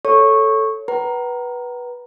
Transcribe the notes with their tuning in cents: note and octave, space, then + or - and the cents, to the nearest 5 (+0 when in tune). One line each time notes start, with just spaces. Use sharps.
A4 +0 C#5 +0 C#6 -10
B4 -15 F#5 +45 A#5 +0